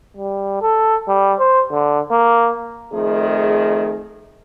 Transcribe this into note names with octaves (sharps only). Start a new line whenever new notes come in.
G3
A4
G3
C5
D3
A#3
F2 D#3 A3 G#4